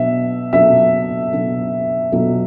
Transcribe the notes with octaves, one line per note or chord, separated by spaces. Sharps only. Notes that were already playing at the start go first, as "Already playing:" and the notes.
Already playing: B2 F#3 B3 D4 E5
B2 F#3 B3 D4 A4 E5
B2 F#3 B3 D4 A4
B2 F#3 B3 D4 A4